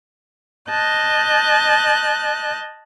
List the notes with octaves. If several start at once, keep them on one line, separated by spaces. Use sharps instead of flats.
D#5 A5 F#6 G6